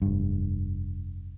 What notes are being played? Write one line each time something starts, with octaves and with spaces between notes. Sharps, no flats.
F1 G2